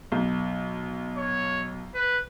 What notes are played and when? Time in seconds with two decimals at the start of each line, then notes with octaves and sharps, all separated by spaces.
0.12 B1
1.17 C#5
1.95 B4